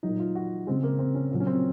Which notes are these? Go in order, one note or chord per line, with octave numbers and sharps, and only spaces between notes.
A#2 F#3 D#4
F4
F#4
C#3 G#3 C4
A#3
C4
C#4
A#2 F#3
C#4
C4